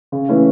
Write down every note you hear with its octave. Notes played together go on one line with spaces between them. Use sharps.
C#3
E3 A3 C#4